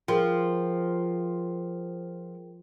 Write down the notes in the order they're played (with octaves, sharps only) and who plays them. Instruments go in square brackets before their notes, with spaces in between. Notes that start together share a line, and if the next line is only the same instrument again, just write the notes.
[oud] F3 [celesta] G#4 A#4 G5